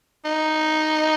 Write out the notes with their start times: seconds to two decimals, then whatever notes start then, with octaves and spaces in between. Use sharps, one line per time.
0.25 D#4